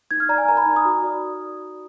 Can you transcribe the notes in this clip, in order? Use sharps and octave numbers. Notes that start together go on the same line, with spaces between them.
D#4 G#6
F6
D5 A#5
G#5
A#4 A#5
B5
D#4
D#6
F#4
D5